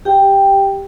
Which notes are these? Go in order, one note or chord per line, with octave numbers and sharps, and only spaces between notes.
G4 G5